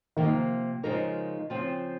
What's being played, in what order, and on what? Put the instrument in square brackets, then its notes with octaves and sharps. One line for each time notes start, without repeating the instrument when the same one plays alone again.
[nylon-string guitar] C3 F3 A#3 [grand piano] D#3
[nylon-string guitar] C#3 F3 G#3 D#4 A#4
C#3 F3 C4 F4